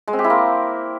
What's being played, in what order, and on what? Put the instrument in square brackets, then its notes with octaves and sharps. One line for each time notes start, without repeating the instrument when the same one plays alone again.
[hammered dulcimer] G#3
C4
G4
E4
A#3